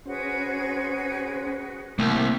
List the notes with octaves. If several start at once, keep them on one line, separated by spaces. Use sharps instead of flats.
C#4 F#4 G#4 B4 C5
C2 A3 A#3 G5